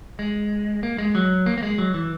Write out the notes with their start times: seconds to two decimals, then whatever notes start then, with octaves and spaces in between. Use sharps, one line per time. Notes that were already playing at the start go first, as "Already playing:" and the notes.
0.19 G#3
0.83 A#3
0.98 G#3
1.15 F#3
1.46 A#3
1.58 A#3
1.63 G#3
1.78 F#3
1.94 E3